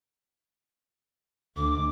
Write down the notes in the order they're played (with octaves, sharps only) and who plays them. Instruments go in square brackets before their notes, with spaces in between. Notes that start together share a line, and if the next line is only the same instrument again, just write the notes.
[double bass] D2 [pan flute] D6